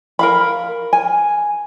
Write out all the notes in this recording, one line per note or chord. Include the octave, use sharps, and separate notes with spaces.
A#4 F5 B5
G#5